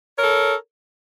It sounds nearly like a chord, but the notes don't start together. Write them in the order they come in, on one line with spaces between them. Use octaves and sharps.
C#5 A#4 A4